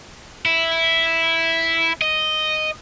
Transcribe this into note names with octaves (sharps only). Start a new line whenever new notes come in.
E4
D#5